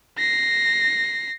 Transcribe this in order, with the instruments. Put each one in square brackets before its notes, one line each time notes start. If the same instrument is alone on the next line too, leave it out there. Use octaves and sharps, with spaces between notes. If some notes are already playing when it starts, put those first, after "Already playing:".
[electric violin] A#6 C7